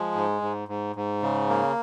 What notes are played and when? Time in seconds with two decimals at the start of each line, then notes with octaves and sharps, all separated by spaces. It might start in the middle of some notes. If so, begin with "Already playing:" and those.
Already playing: F3 G#3
0.14 G#2
0.42 G#2
0.68 G#2
0.96 G#2
1.22 C#3
1.49 A#3